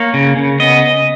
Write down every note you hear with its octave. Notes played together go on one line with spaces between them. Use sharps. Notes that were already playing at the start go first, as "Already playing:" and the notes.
Already playing: A#3 C#5
C#3
C#3
B3 D#5